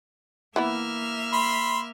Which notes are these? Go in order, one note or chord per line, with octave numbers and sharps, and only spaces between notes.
E3 A#3 B3 E4 E5 F6
B5 C6